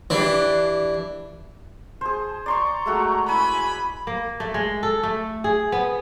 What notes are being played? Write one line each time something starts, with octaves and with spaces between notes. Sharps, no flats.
E3 D4 G4
G#4 C5 A5
D5 A#5 C6 C#6
G#3 A3 F#4
E4 G#5 B5
A#3
A3
G#3
A4
A3
G#4
B3